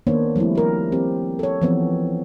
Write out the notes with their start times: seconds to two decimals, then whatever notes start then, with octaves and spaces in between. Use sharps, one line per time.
0.07 D#3 A#3 B3 D4 C5 C#5
0.36 F3 G3 A3 C4 E4
0.55 G4 A#4
0.92 F3 C4 G4
1.39 A4 C#5
1.62 E3 F3 B3 C4